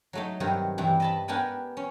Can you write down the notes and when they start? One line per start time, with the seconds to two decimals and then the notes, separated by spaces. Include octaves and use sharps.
0.13 F#3 A3 D#4
0.40 G2 C3 D#3 F#3
0.78 G2 C3 E3 G3
1.00 D#5 A5 B5
1.28 B3 D4 G4 A#4 G#5 B5
1.77 C#4